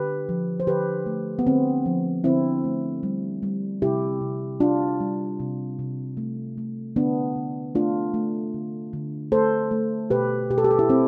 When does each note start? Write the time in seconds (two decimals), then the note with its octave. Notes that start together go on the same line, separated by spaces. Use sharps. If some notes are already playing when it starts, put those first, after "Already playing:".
Already playing: D3 G4 B4
0.29 F3
0.60 C5
0.67 D3 G4 B4
1.06 A3
1.39 B3
1.47 D3 C4
1.86 F3
2.24 D3 C4 E4
2.64 A3
3.03 G3
3.43 G3
3.82 C3 E4 G4
4.21 C3
4.60 G3 D4 F4
5.00 G3
5.40 C3
5.79 C3
6.17 A3
6.58 A3
6.96 D3 B3 D4
7.36 D3
7.75 A3 D4 F4
8.14 A3
8.54 D3
8.93 D3
9.32 A3 A4 C5
9.71 A3
10.10 B2 G4 B4
10.50 B2 G4
10.58 A4
10.64 G4
10.71 A4
10.79 E4 G4
10.89 A3 C4 E4